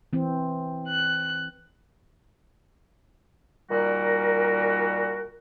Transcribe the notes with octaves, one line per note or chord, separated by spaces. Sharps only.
E3 C4
F#6
A#2 D#3 G3 F#4 A#4